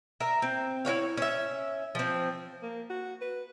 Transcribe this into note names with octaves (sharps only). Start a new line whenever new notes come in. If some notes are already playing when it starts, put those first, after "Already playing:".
A#4 E5
C4
E4 F#4 C#5 F5
C#4 E5
F3 C4
A#3
F#4
B4